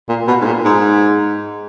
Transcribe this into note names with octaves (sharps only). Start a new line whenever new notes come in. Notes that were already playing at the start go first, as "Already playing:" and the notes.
A#2
B2
G#2
A#2
G#2